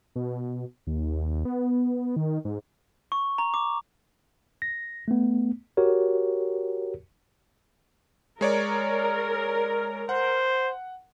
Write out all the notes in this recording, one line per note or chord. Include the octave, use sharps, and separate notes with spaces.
B2
D#2
B3
D#3
G#2
C#6
A#5
D6
A#6
A3 B3
F#4 G4 A#4 C#5
G#3 A#4 C#5 D5
C5 F#5